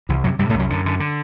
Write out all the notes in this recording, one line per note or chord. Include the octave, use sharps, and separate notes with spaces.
C2 E3
F#2 C3 F#3
G2 C3 G3
A2 A3
C2
F#2 F#3
F#2 D3
D3
D3